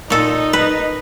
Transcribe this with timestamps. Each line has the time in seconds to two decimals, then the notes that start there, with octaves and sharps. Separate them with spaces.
0.10 A#2 D#4 A4
0.53 B4